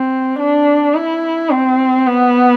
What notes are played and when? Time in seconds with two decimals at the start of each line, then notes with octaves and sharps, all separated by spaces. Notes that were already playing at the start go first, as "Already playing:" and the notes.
Already playing: C4
0.39 D4
0.95 E4
1.50 C4
2.07 B3